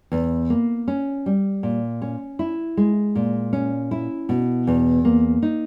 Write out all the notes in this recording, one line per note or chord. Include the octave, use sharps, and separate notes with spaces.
E2
A#3
C#4
G3
A#2
C#4
E4
G#3
A#2
C#4
E4
B2
E2
A#3
D#4